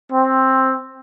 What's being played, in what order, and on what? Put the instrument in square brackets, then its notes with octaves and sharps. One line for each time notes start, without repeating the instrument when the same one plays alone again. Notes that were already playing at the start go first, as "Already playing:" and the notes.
[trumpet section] C4